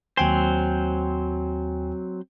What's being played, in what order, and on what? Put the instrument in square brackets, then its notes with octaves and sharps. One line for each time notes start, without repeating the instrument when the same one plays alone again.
[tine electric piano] D#2 G5 G#5 [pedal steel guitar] F#3 C4 C5